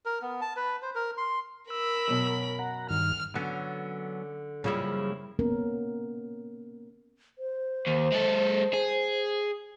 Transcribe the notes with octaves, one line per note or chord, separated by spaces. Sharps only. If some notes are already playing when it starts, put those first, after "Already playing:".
A#4
B3
A5
B4
C5
A#4
C6
A#4 B5 E6
F#2 B2 F#3
F#5 A#5
G2 D#3 F6
D3 F#3 B3 C#4
F#2 C#3 F3 G3 A#3 E4
A#3 B3 C#4 A#4
C5
D#2
G#3 A4
G#4